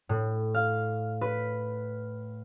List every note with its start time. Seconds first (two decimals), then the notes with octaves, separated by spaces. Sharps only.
0.09 A2
0.54 F5
1.21 B4